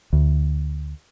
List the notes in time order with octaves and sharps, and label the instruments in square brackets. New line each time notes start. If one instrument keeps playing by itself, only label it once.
[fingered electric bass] D2